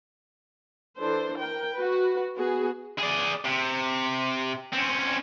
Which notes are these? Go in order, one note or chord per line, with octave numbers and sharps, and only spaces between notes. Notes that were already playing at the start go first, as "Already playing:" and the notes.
E3 D4 A4 C5
A#4 G5
F#4 B4
B3 F#4 G#4
G#4 D5
C3
C4 C#4